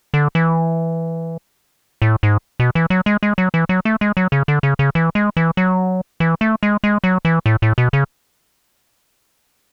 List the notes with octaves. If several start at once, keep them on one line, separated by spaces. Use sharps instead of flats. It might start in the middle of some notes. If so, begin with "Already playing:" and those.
D3
E3
A2
G#2
B2
E3
F#3
G#3
G#3
F#3
E3
F#3
A3
G#3
F#3
C#3
D3
C#3
C#3
E3
G#3
E3
F#3
E3
A3
G#3
G#3
F#3
E3
A2
A2
B2
C#3